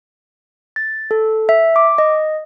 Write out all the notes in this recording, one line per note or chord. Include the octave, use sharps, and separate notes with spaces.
A6
A4
E5
D6
D#5